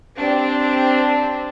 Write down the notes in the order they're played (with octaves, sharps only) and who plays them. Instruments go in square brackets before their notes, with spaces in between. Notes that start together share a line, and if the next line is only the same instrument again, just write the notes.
[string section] C4 D4 G4